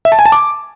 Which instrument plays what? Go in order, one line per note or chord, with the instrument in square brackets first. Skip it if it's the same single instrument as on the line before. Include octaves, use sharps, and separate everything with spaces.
[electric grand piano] E5
A5
G#5
A5
D6